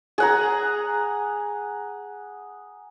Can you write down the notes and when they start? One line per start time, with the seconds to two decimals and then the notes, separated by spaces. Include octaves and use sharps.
0.18 G#4 F#5 A#5